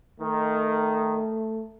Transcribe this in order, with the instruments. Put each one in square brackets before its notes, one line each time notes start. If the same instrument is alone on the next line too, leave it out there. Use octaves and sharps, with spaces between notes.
[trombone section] D#3 [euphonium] A3